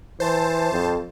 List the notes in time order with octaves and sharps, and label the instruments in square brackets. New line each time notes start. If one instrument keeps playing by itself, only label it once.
[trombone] E3 [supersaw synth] C5 A5
[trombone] F2